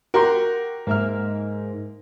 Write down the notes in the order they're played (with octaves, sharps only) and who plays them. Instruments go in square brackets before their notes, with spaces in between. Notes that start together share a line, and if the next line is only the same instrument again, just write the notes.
[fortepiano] F#4 G4 C6 [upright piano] A#4
[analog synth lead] G#2 [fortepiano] A#3 E5 F6